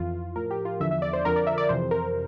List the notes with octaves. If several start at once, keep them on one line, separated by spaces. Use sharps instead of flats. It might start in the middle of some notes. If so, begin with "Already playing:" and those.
Already playing: F2 E3 F4
A2 F3 A#4
G4
F4
E2 D3 F3 E5
E5
D5
C5
F2 D3 F3 A#4
D5
E5
D5
F2 C3 E3 C5
A#4